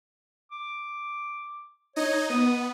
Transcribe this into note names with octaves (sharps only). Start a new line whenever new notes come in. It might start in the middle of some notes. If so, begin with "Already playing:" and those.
D6
D#4 C#5 D#5
B3 D#6